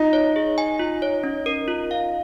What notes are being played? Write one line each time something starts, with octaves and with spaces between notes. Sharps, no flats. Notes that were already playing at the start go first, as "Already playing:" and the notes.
Already playing: D#4 F4
C#5
G#4
G#5
F4
C#5
C#4
A#4
F4
F5